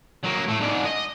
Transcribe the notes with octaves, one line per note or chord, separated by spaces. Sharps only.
F#3 A#3
A2 A3
G#2 D3
D#5